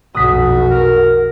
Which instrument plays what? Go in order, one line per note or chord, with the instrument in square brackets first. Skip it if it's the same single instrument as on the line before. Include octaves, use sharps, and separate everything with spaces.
[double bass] B1 F2 [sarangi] F#4 [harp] D#6 F#6 B6
[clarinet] A#4